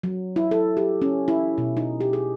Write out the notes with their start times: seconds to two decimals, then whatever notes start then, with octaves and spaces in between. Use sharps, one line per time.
0.03 F#3
0.36 E4
0.51 A4
0.77 G4
1.02 C#4
1.28 E4
1.58 B2
1.77 D#4
2.01 G4
2.13 G#4